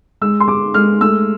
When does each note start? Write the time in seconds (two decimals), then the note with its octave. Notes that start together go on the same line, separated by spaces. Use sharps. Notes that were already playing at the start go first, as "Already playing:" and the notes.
0.21 G#3 E6
0.40 C6
0.48 G#3 D6
0.74 G#3 F6
1.01 A3 E6